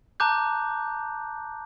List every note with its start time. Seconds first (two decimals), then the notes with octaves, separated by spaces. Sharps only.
0.20 A5 A#5 D6 F#6 G6